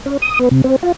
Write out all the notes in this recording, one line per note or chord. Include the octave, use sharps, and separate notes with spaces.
C#4
D#6
B3
C3
C4
F4